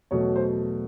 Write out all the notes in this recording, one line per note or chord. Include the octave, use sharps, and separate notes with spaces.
E2 B2 F#3 A3 C#5
C5